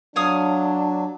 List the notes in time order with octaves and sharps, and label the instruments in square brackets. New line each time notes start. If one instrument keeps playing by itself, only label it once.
[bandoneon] F#3 [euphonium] D4 [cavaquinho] C#5 F5 D#6